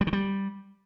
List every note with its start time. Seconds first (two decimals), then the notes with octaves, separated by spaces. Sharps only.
0.01 G3
0.07 D#3
0.13 G3